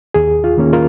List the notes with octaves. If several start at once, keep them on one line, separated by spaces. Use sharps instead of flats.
D#2 G#4
F4
D#3 A#3 C#4
F4 A#4